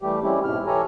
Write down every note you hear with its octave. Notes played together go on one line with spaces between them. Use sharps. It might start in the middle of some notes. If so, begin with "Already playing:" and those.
E3 G3 A3 G4
G3 G#3 C4 C#4 E4 G4
G#2 B2 E4 F6
E3 G4 A4 C#5 G#5 A#5